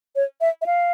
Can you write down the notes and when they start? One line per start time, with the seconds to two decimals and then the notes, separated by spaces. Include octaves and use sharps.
0.16 C#5
0.41 E5
0.62 E5
0.66 F5